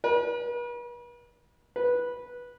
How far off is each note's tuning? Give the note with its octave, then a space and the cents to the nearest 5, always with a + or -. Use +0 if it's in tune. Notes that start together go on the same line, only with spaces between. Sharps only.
B4 -40
B4 -10